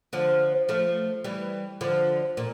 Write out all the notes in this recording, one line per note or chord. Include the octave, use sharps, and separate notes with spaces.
D3 F3
F3 A3
E3 G3
D3 F3
A#2